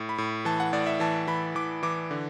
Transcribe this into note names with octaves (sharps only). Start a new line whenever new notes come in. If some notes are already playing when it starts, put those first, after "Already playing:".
Already playing: A2
B5
A2
E3 A5
F#5
A2 D5
E5
E3 A5
E3 B5
E3 D6
E3 D6
D3